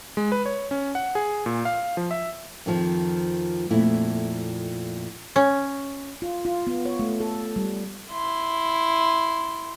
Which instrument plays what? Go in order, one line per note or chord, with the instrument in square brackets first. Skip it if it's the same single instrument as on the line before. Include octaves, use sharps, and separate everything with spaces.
[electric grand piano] G#3
B4
C#5
C#4
F#5
G#4
A#2
F5
F3
E5
[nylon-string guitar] F2 D#3 F3
F2 A#2 A3 E4
[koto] C#4
[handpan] F4
F4
B3
C#5
A3
A4
G3
[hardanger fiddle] E4 C6